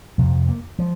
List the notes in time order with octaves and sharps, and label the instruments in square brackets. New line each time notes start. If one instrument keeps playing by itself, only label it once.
[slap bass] F2 C3 F3
A#3
F3